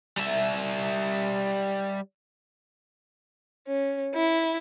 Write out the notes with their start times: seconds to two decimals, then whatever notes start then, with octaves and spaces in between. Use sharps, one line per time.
0.17 G3 E5
3.67 C#4
4.15 E4